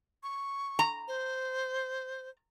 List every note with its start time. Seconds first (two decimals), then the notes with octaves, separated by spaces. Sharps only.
0.23 C#6
0.79 A#5
1.08 C5